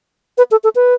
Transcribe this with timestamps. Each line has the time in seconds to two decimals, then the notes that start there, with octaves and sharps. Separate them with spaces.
0.38 B4
0.51 A4
0.64 A4
0.76 B4